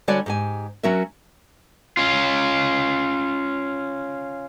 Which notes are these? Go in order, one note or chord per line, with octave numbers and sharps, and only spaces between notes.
D3 G3 F#4 C#5 D5 G#5
G#2 G4 G#5
F#3 C#4 F#4 A#4 E5
C#4 F4